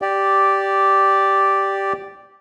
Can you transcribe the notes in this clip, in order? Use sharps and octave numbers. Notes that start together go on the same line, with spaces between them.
G4 D5